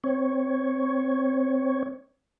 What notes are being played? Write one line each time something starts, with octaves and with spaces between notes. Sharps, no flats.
C4 C#5